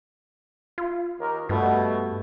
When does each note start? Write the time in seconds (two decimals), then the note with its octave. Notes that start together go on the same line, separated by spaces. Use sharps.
0.78 F4
1.20 D#2 A#4
1.49 G2 B2 A3